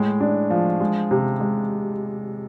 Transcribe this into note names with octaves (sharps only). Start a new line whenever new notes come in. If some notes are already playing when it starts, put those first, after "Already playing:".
Already playing: A2 G#3
D4
F3
G#3
C3
G#3